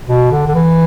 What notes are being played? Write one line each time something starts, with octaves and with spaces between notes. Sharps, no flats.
B2
D3
D3
E3